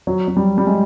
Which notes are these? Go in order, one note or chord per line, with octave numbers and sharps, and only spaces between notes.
F#3
F#3
G3
G3
G#3